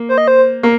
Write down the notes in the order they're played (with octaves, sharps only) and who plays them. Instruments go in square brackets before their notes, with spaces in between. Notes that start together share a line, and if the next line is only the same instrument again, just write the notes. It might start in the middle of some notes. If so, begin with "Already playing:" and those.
Already playing: [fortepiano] A#3
[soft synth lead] C5
D#5
C5
[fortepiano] A#3